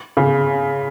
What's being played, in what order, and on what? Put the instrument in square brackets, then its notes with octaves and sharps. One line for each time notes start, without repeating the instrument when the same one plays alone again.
[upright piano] C#3